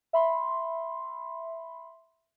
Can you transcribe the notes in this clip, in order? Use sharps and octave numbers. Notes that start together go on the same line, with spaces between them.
E5 B5 C6